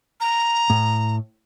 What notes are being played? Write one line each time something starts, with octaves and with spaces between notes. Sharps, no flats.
A#5
A2